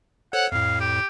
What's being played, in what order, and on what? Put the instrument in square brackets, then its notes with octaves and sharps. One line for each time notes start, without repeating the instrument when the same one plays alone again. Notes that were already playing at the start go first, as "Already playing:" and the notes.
[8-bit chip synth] A4 C5 C#5 [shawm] F#5
[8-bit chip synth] F2 A2 [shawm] F5
[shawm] G4